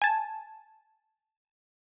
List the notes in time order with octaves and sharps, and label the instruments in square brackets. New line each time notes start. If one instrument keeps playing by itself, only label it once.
[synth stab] G#5 A5